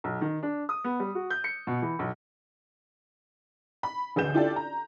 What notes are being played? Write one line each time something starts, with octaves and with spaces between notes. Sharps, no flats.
B1
D#3
D4
D#6
B3
G3
F#4
G6
C#7
B2
E3
B1
B5
A1 D2 G#4 B4 G6 E7
D4 E4 F4 G4 A4 D5
A#5